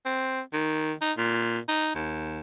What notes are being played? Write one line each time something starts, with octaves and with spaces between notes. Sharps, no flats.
C4
D#3
D#4
A#2
D#4
D#2